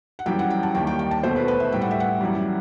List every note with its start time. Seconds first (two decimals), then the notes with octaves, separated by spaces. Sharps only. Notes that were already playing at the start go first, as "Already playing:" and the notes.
0.19 F#5
0.26 F#2 E3 G3 G5
0.39 F#5
0.50 G5
0.63 A5
0.75 D#2 D#3 G3 G5
0.87 G5
0.99 G5
1.11 A5
1.23 E2 B2 A3 C5
1.36 B4
1.48 B4
1.60 E5
1.72 A2 G3 G5
1.81 F#5
1.91 E5
2.00 F#5
2.21 F#2 E3 G3